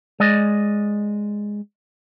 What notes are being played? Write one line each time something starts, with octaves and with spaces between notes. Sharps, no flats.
G#3 D5 D#5